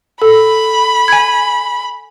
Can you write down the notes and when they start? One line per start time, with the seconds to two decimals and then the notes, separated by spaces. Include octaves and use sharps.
0.22 A4 B5
1.08 G#5 G#6